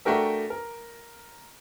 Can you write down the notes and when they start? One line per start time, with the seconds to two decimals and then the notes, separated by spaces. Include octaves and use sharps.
0.05 A3 D4 F#4 G4 A#4 E5
0.50 A#4